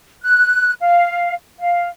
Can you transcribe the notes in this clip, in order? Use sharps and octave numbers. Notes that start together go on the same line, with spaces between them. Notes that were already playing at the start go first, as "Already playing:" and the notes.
F#6
F5
F5